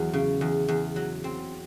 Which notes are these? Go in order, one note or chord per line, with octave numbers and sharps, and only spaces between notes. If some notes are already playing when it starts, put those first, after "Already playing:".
Already playing: E2 F#3
C#3
E2
E2
F#3
C4